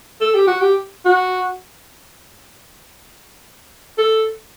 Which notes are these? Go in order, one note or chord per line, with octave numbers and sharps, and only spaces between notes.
A4
G4
F#4
G4
F#4
A4